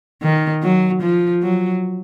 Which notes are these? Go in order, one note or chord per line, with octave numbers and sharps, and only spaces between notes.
D#3
F#3
F3
F#3